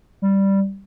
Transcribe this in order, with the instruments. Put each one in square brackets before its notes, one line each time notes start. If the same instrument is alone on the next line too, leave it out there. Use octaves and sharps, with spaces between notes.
[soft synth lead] G3